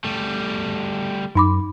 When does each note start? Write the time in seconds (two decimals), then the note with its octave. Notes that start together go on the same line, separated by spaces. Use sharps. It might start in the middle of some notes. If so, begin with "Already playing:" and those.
0.04 G3 A3
1.35 F#2 D#4 B5 D6